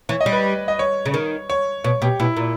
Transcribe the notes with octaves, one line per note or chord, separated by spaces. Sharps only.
E3 C#5
D#5
G3
B4
D#5
C#5
C#3
D#3
C#5
B2 C#5
B2 G4
B2 E4
A#2